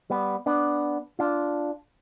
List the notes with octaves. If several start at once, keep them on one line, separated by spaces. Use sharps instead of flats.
G3 B3
B3 D4
D4 F4